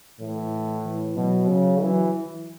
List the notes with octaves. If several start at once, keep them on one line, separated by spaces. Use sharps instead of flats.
A2 E3
E3
B2 F#3
C#3
E3 F#3
E3